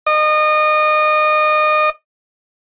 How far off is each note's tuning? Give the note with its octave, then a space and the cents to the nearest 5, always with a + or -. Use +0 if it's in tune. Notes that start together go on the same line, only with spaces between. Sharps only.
D#5 -30